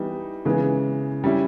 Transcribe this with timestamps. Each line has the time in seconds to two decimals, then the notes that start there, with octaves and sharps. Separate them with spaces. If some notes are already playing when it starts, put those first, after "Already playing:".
Already playing: E3 G3 B3 D#4
0.45 C#3 E3 G#3 B3
1.24 G3 C#4 E4